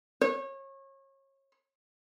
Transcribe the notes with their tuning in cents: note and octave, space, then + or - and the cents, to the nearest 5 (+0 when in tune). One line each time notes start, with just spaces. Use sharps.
C#5 -30